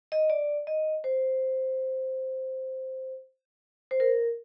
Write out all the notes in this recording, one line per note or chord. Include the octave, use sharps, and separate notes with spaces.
D#5
D5
D#5
C5
C5
A#4